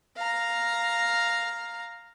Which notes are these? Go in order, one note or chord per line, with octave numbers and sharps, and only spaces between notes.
F5 A#5